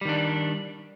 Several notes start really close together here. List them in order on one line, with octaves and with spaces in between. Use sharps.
G3 D#3 D4